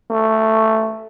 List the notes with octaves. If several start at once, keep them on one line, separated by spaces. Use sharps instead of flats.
A3